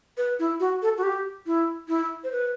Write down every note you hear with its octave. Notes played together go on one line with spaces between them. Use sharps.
B4
E4
F#4
A4
F#4
G4
E4
E4
C5
B4